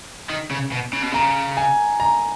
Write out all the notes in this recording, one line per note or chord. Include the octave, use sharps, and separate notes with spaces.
D#3
C#3
B2
C#3
B2
C#3 A#5
G#5
A#5